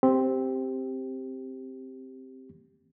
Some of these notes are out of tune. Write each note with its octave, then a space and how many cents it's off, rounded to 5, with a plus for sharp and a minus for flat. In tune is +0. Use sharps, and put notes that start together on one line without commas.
C4 +0 G4 +0